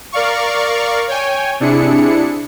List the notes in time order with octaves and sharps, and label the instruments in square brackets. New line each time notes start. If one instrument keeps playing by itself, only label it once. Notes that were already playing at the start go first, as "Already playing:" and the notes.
[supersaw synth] A#4 D5 F5 C#6
C#5 G5 G#5
C3 D4 E4 G#4 C#7